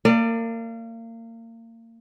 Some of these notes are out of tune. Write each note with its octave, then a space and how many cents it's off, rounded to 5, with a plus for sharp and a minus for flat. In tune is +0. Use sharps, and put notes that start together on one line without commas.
A#3 -30 D5 +20